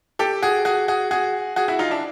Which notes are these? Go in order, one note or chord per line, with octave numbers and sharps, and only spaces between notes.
G4 A4
F#4 G#4
F#4 G#4
F#4 G#4
F#4 G#4
F#4 G#4
E4 F#4
D#4 F4
D4 E4